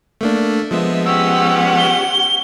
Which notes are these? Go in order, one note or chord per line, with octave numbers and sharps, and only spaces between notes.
A3 A#3 D4
F3 G#3 B3 E5
C#4 G4 F#5 E6
G7